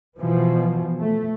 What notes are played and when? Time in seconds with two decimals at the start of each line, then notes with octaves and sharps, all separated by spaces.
0.18 B2 E3 F3
0.99 A3